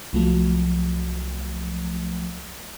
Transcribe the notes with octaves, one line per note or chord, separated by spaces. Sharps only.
C2 F3 F#3 A3